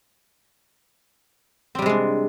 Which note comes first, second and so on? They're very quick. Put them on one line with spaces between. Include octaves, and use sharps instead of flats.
C4 G3 C3 G#3 D4